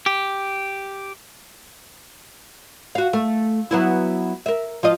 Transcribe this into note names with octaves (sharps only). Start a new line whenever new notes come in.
G4
F#4 F5
A3
F#3 B3 E4
A#4 E5
F3 F4 D#5